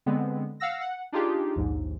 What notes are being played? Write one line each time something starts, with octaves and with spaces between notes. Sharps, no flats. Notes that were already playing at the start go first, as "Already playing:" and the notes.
D3 G#3 B3 C4
F5 F#5 E6 A#6
F#5
D4 D#4 F4 G4 G#4
A#1 D#2 G#2